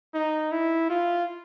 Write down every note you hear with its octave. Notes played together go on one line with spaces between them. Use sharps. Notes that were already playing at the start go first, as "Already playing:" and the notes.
D#4
E4
F4